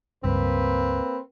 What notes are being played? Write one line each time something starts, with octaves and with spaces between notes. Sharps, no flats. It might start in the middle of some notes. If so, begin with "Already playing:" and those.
C#2 G2 A#3 C4 B4